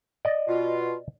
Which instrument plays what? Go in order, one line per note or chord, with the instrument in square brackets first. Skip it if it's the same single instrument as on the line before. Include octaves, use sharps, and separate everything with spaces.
[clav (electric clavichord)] D5 D#5
[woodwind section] B2 F4